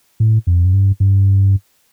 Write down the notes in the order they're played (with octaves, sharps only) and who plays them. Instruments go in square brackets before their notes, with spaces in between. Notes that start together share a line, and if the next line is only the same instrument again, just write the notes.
[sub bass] A2
F2
F#2
G2
G2